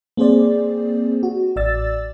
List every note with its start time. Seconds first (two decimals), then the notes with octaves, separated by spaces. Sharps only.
0.17 A#3 C4 G#4 C5 D5
1.23 F#4
1.56 A1 D5 E6 A6